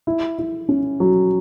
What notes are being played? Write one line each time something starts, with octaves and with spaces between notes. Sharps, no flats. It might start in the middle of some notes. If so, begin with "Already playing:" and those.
E4
E4
C#4
F#3